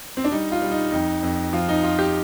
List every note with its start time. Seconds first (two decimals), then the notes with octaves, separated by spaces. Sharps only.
0.17 C4
0.24 D4
0.32 G3 D#4
0.52 F4
0.62 G3
0.72 D#4
0.92 F2 D#4
1.23 F2
1.53 F3 F4
1.69 D#4
1.83 F3 F4
1.99 G4